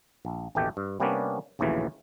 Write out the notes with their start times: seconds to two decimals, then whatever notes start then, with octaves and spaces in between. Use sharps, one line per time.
0.25 A#1
0.55 A1 D#2 B2 A3 G4 G5
0.77 G2
1.00 C3 G3 A#3 B3 C#4 D4
1.59 A#1 D#2 A2 C#3 E3 F#3